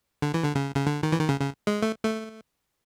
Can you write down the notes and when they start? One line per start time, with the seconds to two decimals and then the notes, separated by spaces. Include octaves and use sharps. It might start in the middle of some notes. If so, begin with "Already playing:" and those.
0.22 D3
0.34 E3
0.43 D3
0.55 C#3
0.76 C#3
0.86 D3
1.03 D#3
1.12 E3
1.19 D#3
1.29 C#3
1.40 C#3
1.67 G#3
1.82 A3
2.04 A3